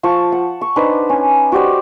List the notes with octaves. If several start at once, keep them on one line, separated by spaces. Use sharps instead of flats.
F3 A5 C#6
F#5
C#6
D4 D#4 B4 C5
C#4
F#4 G4 C5 D5